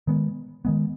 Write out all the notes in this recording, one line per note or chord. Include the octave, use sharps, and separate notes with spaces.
D#3 G#3 B3
D#3 G#3 B3